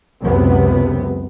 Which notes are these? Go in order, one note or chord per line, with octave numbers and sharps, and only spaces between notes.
C#2 F#2 C3 B3